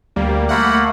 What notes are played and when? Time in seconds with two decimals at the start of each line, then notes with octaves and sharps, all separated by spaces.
0.16 D2 G3 A#3
0.49 A3 A#3 F#5 B5